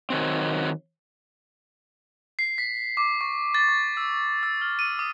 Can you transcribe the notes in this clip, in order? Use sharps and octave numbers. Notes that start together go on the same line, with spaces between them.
D#3 F#3 C4
C7
B6
D6
C#6
A6
C#6
E6
E6
F6
D#7
D#6